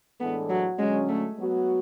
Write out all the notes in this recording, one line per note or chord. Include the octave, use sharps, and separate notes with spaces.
A2 E3 G#3 B3 D4 A4
F#3
D3 F#3 G#3 C#4
A3
F#3 B3 F#4